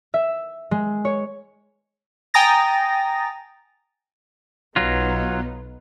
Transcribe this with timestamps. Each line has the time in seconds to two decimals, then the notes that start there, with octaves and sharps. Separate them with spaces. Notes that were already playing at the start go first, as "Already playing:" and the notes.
0.14 E5
0.71 G#3
1.05 C#5
2.34 G5 G#5 A#5 D#6 A6 A#6
4.76 B1 F#3 B3 D#4 F4